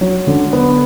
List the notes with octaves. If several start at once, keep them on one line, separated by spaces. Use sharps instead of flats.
F#3
D3
B3